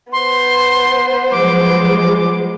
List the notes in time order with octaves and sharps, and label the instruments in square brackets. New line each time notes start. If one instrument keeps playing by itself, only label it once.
[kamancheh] B3 C5 [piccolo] C6
[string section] F3 F#3 G#3 [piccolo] D6